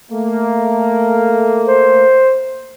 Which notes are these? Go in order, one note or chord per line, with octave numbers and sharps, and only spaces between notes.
A3 A#3
C5